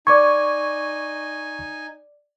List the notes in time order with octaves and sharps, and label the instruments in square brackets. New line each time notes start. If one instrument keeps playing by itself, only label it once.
[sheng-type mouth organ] D#4 G#5 [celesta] D5 D6 G#6 [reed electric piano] C#6